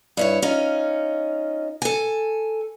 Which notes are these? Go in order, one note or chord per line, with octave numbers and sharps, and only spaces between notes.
G2 E4 C#5
C#4 D#4 F4
A4 G#5